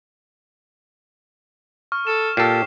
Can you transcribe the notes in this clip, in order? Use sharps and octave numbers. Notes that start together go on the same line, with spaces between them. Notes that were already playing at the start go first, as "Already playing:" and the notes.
C#6 F6
A4 E7
A#2 G4 A4 C7